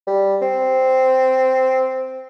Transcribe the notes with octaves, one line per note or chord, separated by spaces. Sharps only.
G3
C4